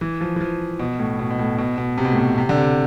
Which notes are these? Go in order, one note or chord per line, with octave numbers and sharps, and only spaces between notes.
E3
F3
E3
F3
B2
A2
B2
B2
A2
B2
B2
C3
B2
A2
B2
C3
D3
C3